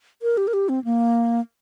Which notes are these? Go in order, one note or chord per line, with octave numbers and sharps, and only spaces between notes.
A#4
G4
A#4
G4
C4
A#3